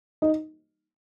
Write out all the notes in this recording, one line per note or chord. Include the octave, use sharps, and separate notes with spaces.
D#4